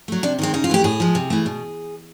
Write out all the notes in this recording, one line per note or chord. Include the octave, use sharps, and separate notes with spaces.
F#3 A3
C3 D4
D#3 G#3 C4
C#3 D#4
F4
E3 A3 G4
A2 G#4
F3 G#3
C3
E3 A3
B2